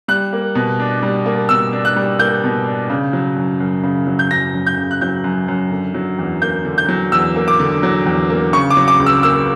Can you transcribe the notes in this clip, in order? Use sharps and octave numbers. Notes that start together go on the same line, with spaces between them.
G3 F#6
A#3
B2
D4
G3
A#3
B2 E6
D4
F#6
G3
A#3 G6
B2
D4
C#3
F#3
F#2
F#2
C#3
F#3
G6
F#2 A#6
F#2
G6
C#3
F#6
F#3 G6
F#2
F#2
D3
F#3
E2
A#3 G6
D3
G6
F#3
E2 E6
A#3
D6
D3
F#3
E2
A#3
C#3 C#6
D6
F#3
D6
C#2
E6
A#3 E6